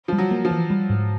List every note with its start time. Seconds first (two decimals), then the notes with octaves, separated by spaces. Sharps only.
0.08 F3 G3
0.18 F#3
0.31 A#3
0.45 F3
0.51 E3
0.70 G3
0.90 G#2